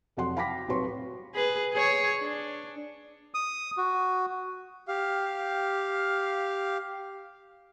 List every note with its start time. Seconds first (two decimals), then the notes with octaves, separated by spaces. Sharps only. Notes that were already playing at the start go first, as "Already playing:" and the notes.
0.17 F1 F2 F#3 F#5 C6
0.37 F5 G5 B5 D6 A#6 B6
0.68 C2 A2 F#3 B4 C6 C#6
1.35 G#4 B4
1.73 G#4 C#5
2.19 D4
3.34 D#6
3.78 F#4
4.88 G4 F5